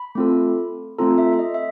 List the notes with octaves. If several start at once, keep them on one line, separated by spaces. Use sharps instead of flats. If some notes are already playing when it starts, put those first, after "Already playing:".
Already playing: B5
A3 C4 F4 A4
A3 C4 F4 A4 A#5
E5
E5
D#5
E5